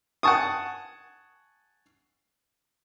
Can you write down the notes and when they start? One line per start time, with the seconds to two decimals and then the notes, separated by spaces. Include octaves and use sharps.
0.23 F#5 G#5 A5 C#6 D#6